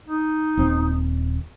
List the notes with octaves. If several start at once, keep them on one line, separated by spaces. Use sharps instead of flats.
D#4
D#1 C4